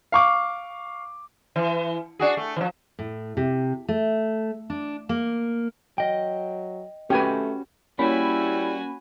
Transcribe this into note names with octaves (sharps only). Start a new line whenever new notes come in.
F5 C#6 D6
E3
D4 F#4 G#4
A3
E3 F3
A2
C3
A3
D4
A#3
F#3 D#5 G5
A3 C#4 F#4 G4 B4 G#5
G3 A#3 C#4 E4 F#4 G#5 B5